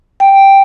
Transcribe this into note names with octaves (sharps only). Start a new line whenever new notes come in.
G5